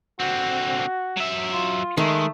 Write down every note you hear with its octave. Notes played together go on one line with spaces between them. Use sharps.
D3 C4 F#4
F#3 E5
F4
D#3 G#3 A3